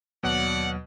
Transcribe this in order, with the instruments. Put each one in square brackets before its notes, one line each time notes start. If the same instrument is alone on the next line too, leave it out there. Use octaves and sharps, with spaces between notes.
[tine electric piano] D#2 F#3 [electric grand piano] B2 [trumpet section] D5 F#5